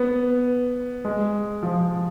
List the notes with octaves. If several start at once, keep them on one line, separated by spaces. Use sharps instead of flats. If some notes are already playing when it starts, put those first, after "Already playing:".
Already playing: B3
G#3
F3